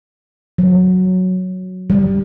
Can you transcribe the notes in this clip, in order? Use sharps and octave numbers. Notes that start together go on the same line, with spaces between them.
F#3
G3